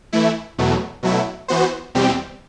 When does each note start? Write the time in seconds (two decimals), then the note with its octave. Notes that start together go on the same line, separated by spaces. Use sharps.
0.13 E3 A3 E4
0.58 E2 B2 F#3 A3
1.03 B2 F#3 A3 E4
1.48 E3 B3 F#4 C5
1.95 E2 B2 G3 C4 G4